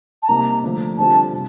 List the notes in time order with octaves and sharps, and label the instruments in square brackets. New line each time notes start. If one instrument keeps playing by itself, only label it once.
[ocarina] A5
[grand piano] C3 G3 A#3 D#4 [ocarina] A#5
[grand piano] D3 F3 A3 D4
[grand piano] D3 G3 C4 F4 [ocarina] A5
[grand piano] C3